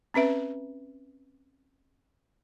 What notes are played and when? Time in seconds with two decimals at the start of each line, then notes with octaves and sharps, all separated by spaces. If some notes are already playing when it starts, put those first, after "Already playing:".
0.14 C4 C#4 B4 E5